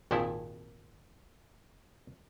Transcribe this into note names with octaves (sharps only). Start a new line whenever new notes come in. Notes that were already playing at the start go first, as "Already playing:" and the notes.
G#1 F2 A#2 D#3 F3 E4